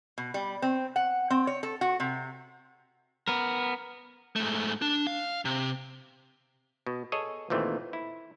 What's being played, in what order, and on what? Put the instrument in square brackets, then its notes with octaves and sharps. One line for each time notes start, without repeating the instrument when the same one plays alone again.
[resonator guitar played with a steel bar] B2
G3
C4
F#5
C4
C#5
A4
F#4
C3
[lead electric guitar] B3 A#4
G#2 A3
D4
F5
C3
[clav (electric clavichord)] B2
G#4 A4 C#5 D#5 G#5
D#2 A#2 E3 A3 C4
E4